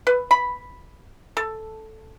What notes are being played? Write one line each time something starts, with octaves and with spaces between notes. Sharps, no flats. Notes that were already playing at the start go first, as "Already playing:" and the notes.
B4
B5
A4